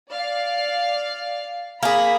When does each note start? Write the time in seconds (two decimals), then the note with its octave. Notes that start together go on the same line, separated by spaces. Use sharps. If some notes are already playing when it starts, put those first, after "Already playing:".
0.12 D5 F5
1.83 A#3 G#4 A#5 B5